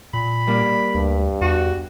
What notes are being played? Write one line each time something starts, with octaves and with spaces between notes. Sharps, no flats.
A#2 B5
G3 A#3 D4
D2 G2
E2 F#4 G4